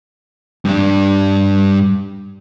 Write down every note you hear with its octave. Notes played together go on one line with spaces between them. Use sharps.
G2 D4